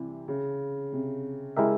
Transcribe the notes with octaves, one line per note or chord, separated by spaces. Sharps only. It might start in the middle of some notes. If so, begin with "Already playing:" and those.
Already playing: C3 E3 G3
C#3
C3
C#3 G#3 E4 G4 A#4 E5